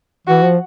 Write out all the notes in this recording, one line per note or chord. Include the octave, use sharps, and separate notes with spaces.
E3 F#4
F3